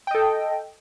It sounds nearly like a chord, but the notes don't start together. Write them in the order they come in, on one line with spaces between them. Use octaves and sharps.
G5 D#5 A4